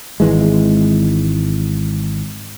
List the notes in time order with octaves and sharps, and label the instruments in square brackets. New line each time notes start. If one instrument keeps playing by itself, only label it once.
[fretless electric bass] G#1 E3 G#3